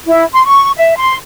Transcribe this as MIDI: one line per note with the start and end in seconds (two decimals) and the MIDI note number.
0.07 0.23 64
0.33 0.42 84
0.46 0.70 85
0.77 0.95 76
0.96 1.15 84